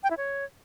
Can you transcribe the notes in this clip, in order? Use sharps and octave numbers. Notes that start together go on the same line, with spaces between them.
G5
E4
C#5